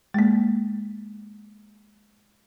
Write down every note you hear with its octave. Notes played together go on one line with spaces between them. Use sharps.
G#3 A#3